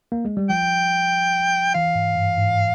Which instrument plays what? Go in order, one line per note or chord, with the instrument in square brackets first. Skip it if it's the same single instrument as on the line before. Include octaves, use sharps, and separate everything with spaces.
[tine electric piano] A#3
G#3
G3
[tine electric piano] F3 [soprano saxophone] G5
[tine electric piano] E3 [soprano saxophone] F5
[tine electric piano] G#2
G2
G#2